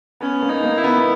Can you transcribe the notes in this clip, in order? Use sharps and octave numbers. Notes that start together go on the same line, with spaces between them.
B3 C#4
A#3
D#4
A#3
E4
B3
B3